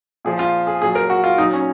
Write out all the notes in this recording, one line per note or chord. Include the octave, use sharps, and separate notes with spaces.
A#2 F3 G#4
F4
G#4
A#2 F#3 G#4
A#4
F#4
F4
A#2 F#3 D#4
C#4